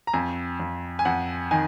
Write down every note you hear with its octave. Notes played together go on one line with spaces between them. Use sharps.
A#5
F2 G#5
F2
G#5
F2 F#5
D#3 G#5